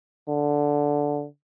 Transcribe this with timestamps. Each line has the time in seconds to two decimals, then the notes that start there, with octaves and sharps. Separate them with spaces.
0.28 D3